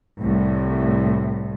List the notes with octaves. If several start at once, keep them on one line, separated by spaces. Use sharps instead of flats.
C2 A2